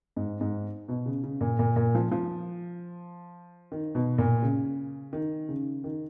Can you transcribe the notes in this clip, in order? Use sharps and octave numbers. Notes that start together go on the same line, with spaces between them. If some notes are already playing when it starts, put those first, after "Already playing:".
G#2
G#2
B2
C#3
C#3
A#2
A#2
A#2
F3
F3
D#3
B2
A#2
C#3
D#3
C#3
D#3